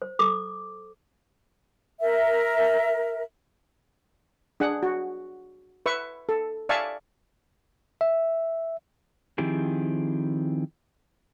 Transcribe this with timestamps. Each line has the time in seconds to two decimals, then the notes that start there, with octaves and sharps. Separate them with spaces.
0.02 C5
0.19 A4 D6
2.00 A#4 E5
4.60 D4 G#4 F#5
4.83 F#4
5.86 B4 E5 C#6
6.29 A4
6.69 D5 E5 F5 G#5 A5 C#6
8.01 E5
9.38 D#3 F3 C4 E4 G4 G#4